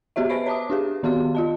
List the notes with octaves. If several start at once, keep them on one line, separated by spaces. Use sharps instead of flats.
B3 F#4 G4 C#5 E5
B4 C5 E5 B5 C7 D7
C#5 A5 D6 D#6
D4 G4 G#4
D#3 B3 F#4 G4 F5 C6
F4 D#5 A5